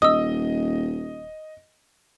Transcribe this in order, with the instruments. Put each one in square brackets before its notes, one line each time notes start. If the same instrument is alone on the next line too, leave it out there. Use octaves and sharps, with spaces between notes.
[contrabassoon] D#1 [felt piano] D#5 [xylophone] D#6 E6